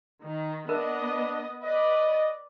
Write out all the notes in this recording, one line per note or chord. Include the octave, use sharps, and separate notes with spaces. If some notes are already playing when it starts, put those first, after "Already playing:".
D#3
B3 D4 A#4 B4 D#5
B4 D5 D#5